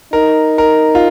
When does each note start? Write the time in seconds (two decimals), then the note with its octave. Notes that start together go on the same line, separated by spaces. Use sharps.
0.13 D#4 A#4
0.58 A#4
0.95 F4